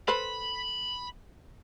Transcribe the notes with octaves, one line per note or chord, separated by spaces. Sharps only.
A4 B4 C5 B5